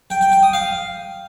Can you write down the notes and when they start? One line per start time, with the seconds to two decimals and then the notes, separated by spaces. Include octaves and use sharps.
0.10 G5
0.21 G5
0.32 G5
0.43 D#6
0.53 F5